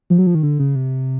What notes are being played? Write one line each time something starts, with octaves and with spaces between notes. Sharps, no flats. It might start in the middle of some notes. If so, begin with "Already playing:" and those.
F3
F#3
F3
D#3
D3
C#3
C3